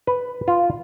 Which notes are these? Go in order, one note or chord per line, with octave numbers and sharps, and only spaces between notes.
B4
F4